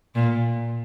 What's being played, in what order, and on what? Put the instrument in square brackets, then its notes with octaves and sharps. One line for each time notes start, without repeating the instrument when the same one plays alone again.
[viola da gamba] A#2